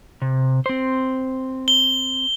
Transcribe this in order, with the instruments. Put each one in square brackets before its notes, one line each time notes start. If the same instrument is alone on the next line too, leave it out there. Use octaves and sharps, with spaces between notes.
[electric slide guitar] C3
C4 C5
[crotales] G7